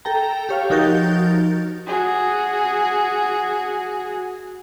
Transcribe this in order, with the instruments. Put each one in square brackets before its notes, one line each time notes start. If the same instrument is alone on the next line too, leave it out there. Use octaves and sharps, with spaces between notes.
[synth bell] A4 G5 A#5
G4 C#5 F5
F3 D#4 F#4 A#4 G6 A6
[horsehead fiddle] F#4 G#4